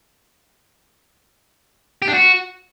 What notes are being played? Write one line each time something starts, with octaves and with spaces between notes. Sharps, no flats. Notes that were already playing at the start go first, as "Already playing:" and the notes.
G4
D4
F#4